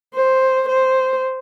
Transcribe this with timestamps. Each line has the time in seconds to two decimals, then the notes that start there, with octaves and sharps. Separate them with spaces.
0.15 C5
0.69 C5